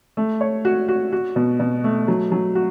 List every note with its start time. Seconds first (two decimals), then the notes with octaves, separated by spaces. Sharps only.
0.17 A3
0.41 C#5
0.65 F#4
0.88 F#4
1.12 F#4
1.36 B2
1.60 B2
1.84 A3
2.08 F#3
2.32 F#3
2.55 F#4